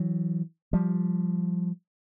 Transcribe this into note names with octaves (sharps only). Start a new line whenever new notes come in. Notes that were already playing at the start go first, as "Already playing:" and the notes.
Already playing: E3 F#3
F3 G3